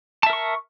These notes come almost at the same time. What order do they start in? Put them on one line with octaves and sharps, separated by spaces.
A5 E5 A#4 C#6